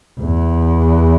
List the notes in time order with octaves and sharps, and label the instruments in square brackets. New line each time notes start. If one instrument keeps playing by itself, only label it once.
[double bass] E2